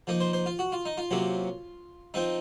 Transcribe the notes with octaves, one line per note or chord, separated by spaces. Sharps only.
F3 A#3 D#4
C5
C5
F4
F#4
F4
D#4
F4
C3 F#3 A#3 C#4
F3 C4 D#4